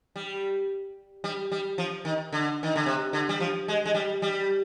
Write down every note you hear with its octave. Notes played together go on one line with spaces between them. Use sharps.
G3
G3
G3
F3
D#3
D3
D#3
D3
C3
D3
G3
F3
G#3
G#3
G3
G3